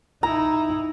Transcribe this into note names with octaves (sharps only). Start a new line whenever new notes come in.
D#4 E4 A#5